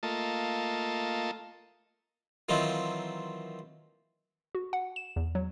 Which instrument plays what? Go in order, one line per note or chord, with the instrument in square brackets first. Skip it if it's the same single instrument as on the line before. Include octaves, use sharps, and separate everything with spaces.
[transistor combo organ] A3 A#3 F4 D#5 A5
[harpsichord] D#3 E3 F#3 C4 D#4 F4
[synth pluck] F#4
F#5
E7
E2
F#3